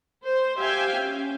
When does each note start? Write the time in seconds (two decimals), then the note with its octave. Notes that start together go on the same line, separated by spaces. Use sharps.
0.25 C5
0.58 G4 E5 F5 G5 G#5
0.96 C#4